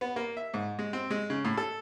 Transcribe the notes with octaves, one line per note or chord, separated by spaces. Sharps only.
B3
A#3
E5
G#2
G#3
C4
G#3
C#3
A2
A4